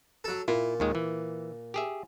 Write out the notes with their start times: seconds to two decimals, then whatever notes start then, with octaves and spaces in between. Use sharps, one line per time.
0.24 F#3 A4
0.48 A#2 E4 F4
0.80 D#2 D#3 G#3
0.95 E3
1.74 G4 G#4 E5